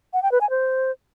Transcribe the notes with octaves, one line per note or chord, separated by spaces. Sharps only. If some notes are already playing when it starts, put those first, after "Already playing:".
F#5
G5
B4
G#5
C5